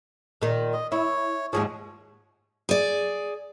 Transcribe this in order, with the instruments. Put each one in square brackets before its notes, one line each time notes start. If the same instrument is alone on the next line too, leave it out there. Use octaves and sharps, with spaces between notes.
[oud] A#2 D#3
[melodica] D#5
[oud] E4 [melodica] C#5
[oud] D#2 G#2 F3 [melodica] G#4 C#5
[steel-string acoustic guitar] G#4 D5